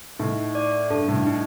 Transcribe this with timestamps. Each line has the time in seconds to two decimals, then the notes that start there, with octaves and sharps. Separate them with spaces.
0.19 A2 D#4
0.55 D5
0.90 G2 A4
1.08 A2
1.14 G2
1.26 D#4